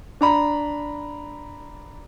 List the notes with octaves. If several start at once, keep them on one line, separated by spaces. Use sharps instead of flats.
D4 A#5 B5